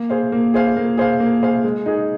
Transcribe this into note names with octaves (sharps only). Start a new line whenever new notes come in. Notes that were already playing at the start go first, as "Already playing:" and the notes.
Already playing: A#3
G#4 C5 F5
A#3
G#4 C5 F5
A#3
G#4 C5 F5
A#3
G#4 C5 F5
G#3
D#4 G#4